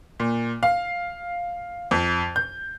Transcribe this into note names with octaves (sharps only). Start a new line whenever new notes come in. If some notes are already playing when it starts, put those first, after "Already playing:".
A#2
F5
F2
G6